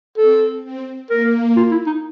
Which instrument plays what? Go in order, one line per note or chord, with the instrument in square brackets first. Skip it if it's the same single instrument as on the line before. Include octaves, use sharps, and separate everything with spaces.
[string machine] C4 [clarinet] A4
[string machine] C4
[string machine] A#3 [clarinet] A#4
[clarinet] F4
E4
D#4